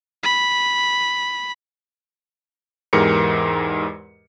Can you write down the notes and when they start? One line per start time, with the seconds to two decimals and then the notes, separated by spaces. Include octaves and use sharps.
0.23 B5
2.93 E2 G#2 E3 G4 A#4 C#7